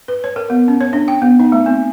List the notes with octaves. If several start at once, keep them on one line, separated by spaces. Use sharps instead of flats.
B4
C#5
A#4
B3
C#4
C#5
D4
G5
B3
D#4
A3
C4